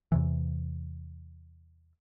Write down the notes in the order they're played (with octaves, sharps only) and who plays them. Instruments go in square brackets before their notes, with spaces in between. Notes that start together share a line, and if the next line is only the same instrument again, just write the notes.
[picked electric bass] E2 C3 E3